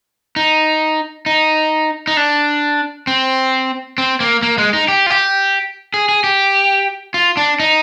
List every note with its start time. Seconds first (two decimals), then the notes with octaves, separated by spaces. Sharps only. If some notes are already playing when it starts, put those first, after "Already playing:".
0.36 D#4
1.26 D#4
2.07 D#4
2.17 D4
3.07 C4
3.98 C4
4.20 A#3
4.43 A#3
4.58 G#3
4.73 D#4
4.88 G4
5.06 F4
5.10 G4
5.94 G#4
6.09 G#4
6.24 G4
7.14 F4
7.37 D4
7.60 D#4